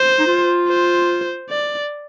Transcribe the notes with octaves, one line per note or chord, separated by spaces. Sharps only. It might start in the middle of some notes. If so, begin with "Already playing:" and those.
Already playing: C5
D#4
F4
C5
D5